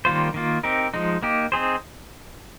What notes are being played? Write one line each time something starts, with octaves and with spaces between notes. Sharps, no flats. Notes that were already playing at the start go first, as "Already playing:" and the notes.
D#3 G3 A#3 F4 C5
D#3 A#3 F4
C4 D#4 G4 A#4
F3 G#3 D#4
A#3 D#4 G4
C4 D#4 G#4 C5